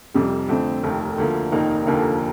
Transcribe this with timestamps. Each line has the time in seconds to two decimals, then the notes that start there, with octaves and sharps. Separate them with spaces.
0.14 F1 F2 C3 G3
0.49 F2 D3 A3 C4
0.83 F1 D#2 D#3 A3
1.18 D2 D3 F3 A#3
1.52 F1 D#2 D#3 A#3 D#4
1.87 F1 D#2 D3 F3 A#3